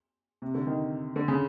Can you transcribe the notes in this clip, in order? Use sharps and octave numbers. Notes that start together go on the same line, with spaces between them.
C3
D3
D#3
D3
C#3